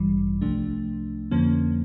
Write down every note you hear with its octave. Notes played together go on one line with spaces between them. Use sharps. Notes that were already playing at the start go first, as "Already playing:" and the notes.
Already playing: A1 G2 E3 G3
C2 C3 F3 A3 D4
F2 D3 F3 A#3 C#4